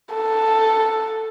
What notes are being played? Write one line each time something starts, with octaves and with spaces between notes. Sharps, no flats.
A4